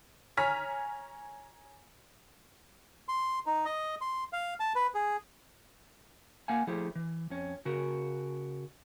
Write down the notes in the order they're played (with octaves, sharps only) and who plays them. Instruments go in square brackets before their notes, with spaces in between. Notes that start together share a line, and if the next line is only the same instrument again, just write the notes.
[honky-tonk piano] C#5 G#5 A#5 F6 B6
[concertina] C6
D#4
D#5
C6
F5
A5
B4
G#4
[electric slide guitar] A#3 F5 F#5 G#5
F3 A3 E4 G4 G#4
E3
F2 C#4
C#3 F#4 A#4